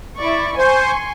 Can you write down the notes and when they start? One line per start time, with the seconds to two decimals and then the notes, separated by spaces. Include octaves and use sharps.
0.17 E4 D5 C#6
0.58 C5 G#5 C6 C#6